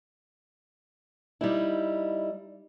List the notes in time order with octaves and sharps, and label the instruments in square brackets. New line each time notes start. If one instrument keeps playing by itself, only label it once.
[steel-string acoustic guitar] G3 D#4 E4